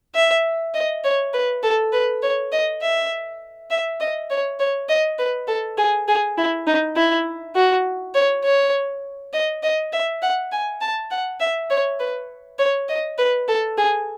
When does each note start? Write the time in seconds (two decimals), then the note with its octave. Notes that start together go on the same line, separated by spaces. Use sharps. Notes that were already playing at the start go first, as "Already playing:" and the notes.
0.15 E5
0.74 D#5
1.04 C#5
1.33 B4
1.63 A4
1.93 B4
2.23 C#5
2.52 D#5
2.82 E5
3.71 E5
4.00 D#5
4.30 C#5
4.60 C#5
4.89 D#5
5.19 B4
5.48 A4
5.78 G#4
6.08 G#4
6.37 E4
6.67 D#4
6.96 E4
7.56 F#4
8.15 C#5
8.45 C#5
9.33 D#5
9.63 D#5
9.93 E5
10.22 F#5
10.52 G#5
10.82 A5
11.11 F#5
11.40 E5
11.70 C#5
12.00 B4
12.59 C#5
12.89 D#5
13.19 B4
13.48 A4
13.78 G#4